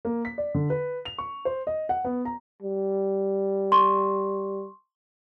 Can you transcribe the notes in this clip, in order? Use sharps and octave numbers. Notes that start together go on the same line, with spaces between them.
A#3
B6
D5
D3
B4
F7
C#6
C5
D#5
F#5
B3
A#5
G3
C6 C#6